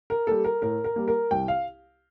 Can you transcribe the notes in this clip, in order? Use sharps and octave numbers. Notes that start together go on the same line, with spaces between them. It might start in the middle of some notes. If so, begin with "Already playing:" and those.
A#4
G3 A#3 A4
A#4
A2 A#4
A#4
G3 A#3
A#4
C2 G5
F5